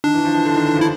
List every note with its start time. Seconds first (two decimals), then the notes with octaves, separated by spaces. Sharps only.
0.04 D#3 D4
0.14 E3
0.25 F3
0.35 E3
0.45 D3
0.55 D#3
0.66 E3
0.76 F3
0.81 E4